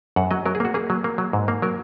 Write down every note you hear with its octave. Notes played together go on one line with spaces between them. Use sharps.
F#2 F#5
F#3 D#5
F#3 A#4
G#4
A#3 F#4
A#3 G#4
F#3
A#3
F#3
G#2
A#3
F#3 A#4